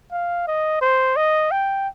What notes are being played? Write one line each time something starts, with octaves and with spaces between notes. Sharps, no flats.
F5
D#5
C5
D#5
G5